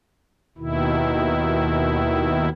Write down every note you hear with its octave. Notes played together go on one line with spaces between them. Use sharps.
D#2 B2 D#3 E4